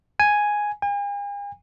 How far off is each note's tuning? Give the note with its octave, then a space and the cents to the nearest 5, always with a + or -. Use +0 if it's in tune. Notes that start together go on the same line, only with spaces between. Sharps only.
G#5 +0
G#5 -45